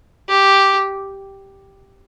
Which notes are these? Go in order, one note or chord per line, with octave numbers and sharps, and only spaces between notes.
G4